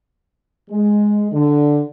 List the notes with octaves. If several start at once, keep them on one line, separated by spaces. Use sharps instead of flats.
G#3
D3